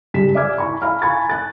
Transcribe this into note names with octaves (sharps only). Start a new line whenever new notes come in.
C#2 G2 G4 B6 E7
D5 E5 D6 F6 G#6
E4 A#5 C#6
E5 F5 A#5 B5 F6
G#5 A#5 B5 C#6 G#6 A6
F#6 A6